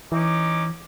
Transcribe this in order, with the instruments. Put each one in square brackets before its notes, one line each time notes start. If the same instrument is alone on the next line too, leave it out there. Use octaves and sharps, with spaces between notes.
[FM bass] E3 [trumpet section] C#4 D#4 D6